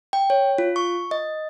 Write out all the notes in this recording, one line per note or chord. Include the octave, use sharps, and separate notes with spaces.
G5
C#5
F4
C#6
D#5